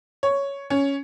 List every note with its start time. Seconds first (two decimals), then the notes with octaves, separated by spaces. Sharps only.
0.23 C#5
0.70 C#4